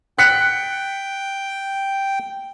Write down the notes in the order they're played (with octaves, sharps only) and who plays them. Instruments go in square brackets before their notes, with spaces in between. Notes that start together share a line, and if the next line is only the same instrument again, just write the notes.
[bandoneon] G5 [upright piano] F#6 B6 C#7